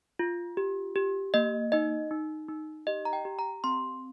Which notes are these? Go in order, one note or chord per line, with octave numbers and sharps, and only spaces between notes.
F4
G4
G4
A#3 D#5
D#4 D#5
D#4
D#4
G4 D#5
A#5
G5
G4
A#5
C4 C6